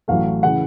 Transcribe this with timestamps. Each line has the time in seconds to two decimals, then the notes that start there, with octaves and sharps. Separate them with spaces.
0.08 A1 A2 F#3 A3 F5
0.43 C#3 E3 F#5